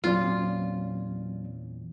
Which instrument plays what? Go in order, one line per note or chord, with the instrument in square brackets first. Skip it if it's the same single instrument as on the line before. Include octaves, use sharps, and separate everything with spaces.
[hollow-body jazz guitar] E2 A#2 C#4 [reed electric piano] F#3 C4 D5 [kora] F4